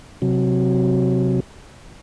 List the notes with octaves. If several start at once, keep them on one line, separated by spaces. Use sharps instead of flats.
C3 F#3